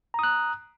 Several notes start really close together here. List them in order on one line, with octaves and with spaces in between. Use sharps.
A#5 D#6 F#6